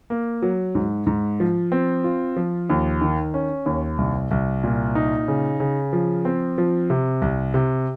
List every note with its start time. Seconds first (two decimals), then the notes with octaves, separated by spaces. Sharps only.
0.10 A#3
0.42 F#3
0.75 G#2
1.07 G#2
1.40 F3
1.72 C4
2.04 F4
2.36 F3
2.70 D#2
3.01 D#3
3.34 C#4
3.66 D#2
3.98 C2
4.31 C2
4.64 A#2
4.95 D#4
5.28 C#3
5.60 C#3
5.93 F3
6.25 C4
6.58 F3
6.90 C3
7.22 C2
7.54 C3